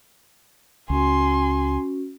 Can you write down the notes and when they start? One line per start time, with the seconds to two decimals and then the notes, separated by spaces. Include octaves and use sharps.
0.90 C#2 C#4 F#4 G#5 C6